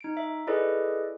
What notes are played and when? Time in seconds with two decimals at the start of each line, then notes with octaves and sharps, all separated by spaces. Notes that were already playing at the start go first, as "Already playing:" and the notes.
0.01 D#4 D7
0.17 E5
0.47 E4 G#4 A4 B4 D5 D#5